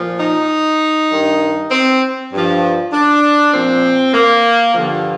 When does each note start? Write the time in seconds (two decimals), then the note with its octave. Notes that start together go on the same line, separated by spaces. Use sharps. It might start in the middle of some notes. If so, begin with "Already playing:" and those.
Already playing: A#2 F3
0.19 D#4
1.11 G2 D#3
1.71 C4
2.31 G2 F3
2.92 D4
3.53 A#2 F3 C4
4.13 A#3
4.74 G2 D3 F3